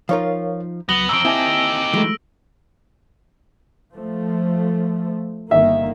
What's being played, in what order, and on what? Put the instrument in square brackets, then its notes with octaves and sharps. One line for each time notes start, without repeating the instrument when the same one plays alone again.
[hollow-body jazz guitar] F3 D#4 F4 [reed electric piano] A#4 C#5 F5
[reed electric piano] C#2 F#3 [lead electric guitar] B3 [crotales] A#6 F#7 G7
[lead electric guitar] F2 G#2 [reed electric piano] A#5 [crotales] E6 D7
[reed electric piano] C4 G#5 A5 [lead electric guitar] D#4 G4 [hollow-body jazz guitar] E4
[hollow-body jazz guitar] E3 F#3 [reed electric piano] G#3 A3
[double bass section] F3 A3
[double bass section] G1 D#3 A#3 [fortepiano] E5